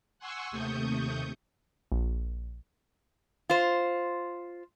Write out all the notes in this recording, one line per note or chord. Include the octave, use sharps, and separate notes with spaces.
F#5 G#5 C6 C#6 E6
D#2 C3 A3 C#6 D#6 G6
A#1
F4 C5